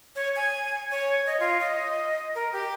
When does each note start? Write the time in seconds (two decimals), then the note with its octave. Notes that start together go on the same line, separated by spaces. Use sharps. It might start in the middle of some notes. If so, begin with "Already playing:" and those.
0.16 C#5
0.36 G#5
0.91 C#5
1.27 D#5
1.40 F4
1.60 D#5
2.35 A#4
2.52 G4